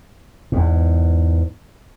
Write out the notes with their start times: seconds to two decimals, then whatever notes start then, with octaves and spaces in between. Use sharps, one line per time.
0.52 E2 G#2